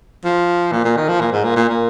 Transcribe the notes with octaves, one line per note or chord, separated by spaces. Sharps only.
F3
A#2
A#2
D#3
F3
A#2
G#2
A#2
A#2
A#2